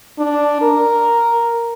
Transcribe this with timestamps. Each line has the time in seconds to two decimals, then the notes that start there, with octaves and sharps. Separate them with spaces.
0.19 D4
0.62 A#4